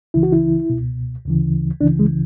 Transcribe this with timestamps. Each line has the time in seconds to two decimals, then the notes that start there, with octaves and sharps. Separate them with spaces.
0.14 C#2 C#3 E3 E4
0.23 F#4
0.32 E4
0.70 C#2 B2
1.25 D2 C#3 E3
1.81 C#2 C#3 E3 D4
1.99 G#3